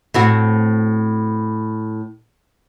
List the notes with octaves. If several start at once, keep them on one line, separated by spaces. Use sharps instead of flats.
A2 C4 F#4